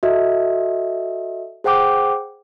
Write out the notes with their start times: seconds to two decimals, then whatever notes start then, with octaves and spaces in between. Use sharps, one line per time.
0.03 F#4 A4 D#5 E5
1.64 G#4 C5 F#5 G5 D6